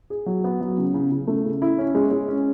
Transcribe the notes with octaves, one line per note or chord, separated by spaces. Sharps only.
G#4
F#3
B3
F#3
C#3
C#3
C#3
A3
C#3
E4
C#4
G#3
G#3
C#4